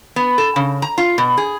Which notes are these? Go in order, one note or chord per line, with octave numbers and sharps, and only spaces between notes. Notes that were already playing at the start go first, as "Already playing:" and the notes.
B3
A4
C#3
A#5
F4
B2
G#4